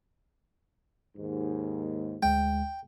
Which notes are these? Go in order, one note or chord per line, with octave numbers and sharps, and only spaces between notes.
D#2 G#2
D2 G#3 G5